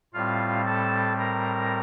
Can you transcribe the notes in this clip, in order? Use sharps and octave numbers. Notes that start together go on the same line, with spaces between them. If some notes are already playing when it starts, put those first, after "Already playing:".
A2 G3 C4 F4 F5
A4 A5
A#4 A#5